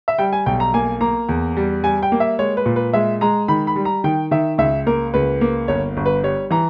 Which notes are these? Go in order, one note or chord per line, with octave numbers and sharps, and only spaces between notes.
E5
G3 G5
G#5
B1 G5
A#5
A#3 G#5
A#3 A#5
E2
G3
G3 G#5
G5
A#3
E5
G#3 C#5
B4
A#2
B4
G#3 E5
G#3 A#5
D#3 B5
B5
G3
A#5
D#3 G5
D#3 E5
C#2 E5
A#3 A#4
C#2 B4
A#3
G1 C#5
G1
B4
G3 C#5
E3 A#5